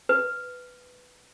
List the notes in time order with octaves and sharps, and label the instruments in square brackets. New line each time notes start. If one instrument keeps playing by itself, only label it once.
[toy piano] B4